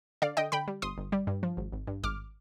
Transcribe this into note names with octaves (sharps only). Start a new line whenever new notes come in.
D3 D5 F5
D3 D#5 G5
D3 G5 B5
G3
G1 C6 D#6
G1
G3
G2
F3
G#1
G#1
G2
G#1 D6 F6